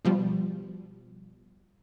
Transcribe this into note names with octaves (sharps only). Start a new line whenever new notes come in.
B2 F3 G3